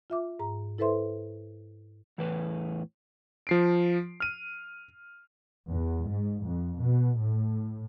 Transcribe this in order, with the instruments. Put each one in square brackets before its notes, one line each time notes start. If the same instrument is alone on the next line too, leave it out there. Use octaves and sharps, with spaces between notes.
[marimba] F4 E5 D6
G#2 A#5
E4 A4 B4 C5 E5 C6
[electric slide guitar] E2 A2 E3 B4
[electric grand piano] F3 C7 D7
F6 D#7
[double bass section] E2
G#2
F2
B2
A2